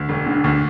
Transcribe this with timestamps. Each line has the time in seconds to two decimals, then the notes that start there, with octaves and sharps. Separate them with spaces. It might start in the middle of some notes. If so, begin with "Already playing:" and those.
Already playing: D2
0.09 E1
0.26 D3
0.44 D2